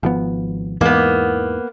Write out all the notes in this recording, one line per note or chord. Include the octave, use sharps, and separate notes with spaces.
G#1 F3 B3
E2 G#2 E3 A#3 B3